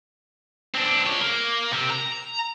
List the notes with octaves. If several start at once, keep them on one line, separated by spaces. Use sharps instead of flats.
C4 D4
G#3 C#5
A#3
C3 C4
A#5